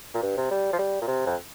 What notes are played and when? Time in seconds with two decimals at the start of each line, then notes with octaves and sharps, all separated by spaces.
0.15 A#2
0.23 G2
0.37 C3
0.51 G3
0.73 F3
0.79 G3
1.01 A#2
1.07 C3
1.26 F2